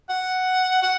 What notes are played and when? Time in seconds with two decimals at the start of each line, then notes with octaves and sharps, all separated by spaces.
0.09 F#5
0.82 F#5